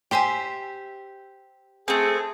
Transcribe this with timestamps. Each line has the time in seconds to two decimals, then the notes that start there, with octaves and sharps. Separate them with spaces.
0.11 G4 C5 E5 G5 G#5
1.88 A3 C4 G#4